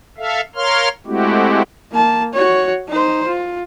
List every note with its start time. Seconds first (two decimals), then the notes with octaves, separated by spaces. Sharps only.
0.18 A4 E5 F5
0.55 A#4 C#5 F5 C6 F6
1.07 G#3 A3 C4 E4 F#4 G4
1.92 A#3 A5
2.34 F#4 C#5
2.88 D#4 C5
3.27 F4